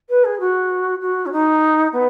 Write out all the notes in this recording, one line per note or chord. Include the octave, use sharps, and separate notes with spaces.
B4
G#4
F#4
F#4
C#4
D#4
B3